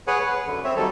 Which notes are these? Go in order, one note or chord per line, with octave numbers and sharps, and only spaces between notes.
G#4 B4 C#5 F#5 G#5
B4
F#2 D3
C4 C#5 E5
D#3 F#3 G3 A4